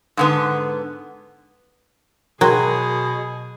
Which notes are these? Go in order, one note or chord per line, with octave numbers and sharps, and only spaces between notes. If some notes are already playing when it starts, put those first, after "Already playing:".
G#2 D3 B3
B2 F#3 G#4 A#4 G5 C6